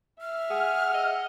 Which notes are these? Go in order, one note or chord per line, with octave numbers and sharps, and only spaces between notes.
E5 F6
G#4 F#5
D#5